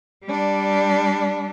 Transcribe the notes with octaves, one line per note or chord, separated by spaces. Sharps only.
G3 D4